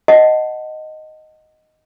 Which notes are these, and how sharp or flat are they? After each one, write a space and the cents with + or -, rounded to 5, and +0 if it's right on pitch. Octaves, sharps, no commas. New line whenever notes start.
D#5 +0 F#5 +0 A5 +0